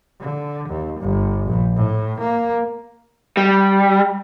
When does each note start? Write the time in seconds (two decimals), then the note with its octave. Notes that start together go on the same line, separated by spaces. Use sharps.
0.20 D3
0.68 D#2
1.00 G1
1.46 A#1
1.76 A2
2.19 A#3
3.37 G3